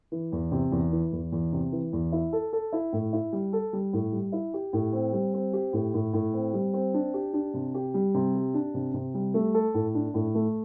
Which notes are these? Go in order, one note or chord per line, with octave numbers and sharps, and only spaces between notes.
E3
E2
C3
E2
E3
E2
E2
C3
E3
E2
E4
A4
A4
E4
A2
E4
G3
A4
G3
A2
G3
E4
G4
A2
C4
G3
C4
G4
A2
A2
A2
C4
G3
C4
D4
G4
D4
C3
G4
G3
C3
G4
D4
C3
C3
G3
A3
A4
A2
D4
A2
A3